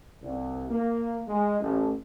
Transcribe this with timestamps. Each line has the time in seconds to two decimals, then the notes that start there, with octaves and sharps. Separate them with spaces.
0.22 C2
0.70 A#3
1.28 G#3
1.60 A1